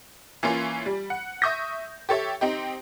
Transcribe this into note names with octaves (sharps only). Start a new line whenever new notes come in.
E3 A#3 C#4 F4
G3
F#5
E5 C#6 D#6 G6 A#6
G4 A4 C#5 E5
C4 D#4 G4